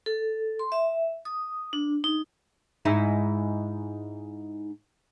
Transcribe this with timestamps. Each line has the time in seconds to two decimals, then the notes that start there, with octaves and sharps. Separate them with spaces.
0.06 A4
0.59 C6
0.72 E5
1.25 D#6
1.73 D4
2.04 D#4
2.85 G#2 D#4 E4